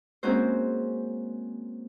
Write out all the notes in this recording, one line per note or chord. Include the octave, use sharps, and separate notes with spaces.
G#3 A#3 C4 C#4 F#4 C5